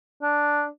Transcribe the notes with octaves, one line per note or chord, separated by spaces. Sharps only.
D4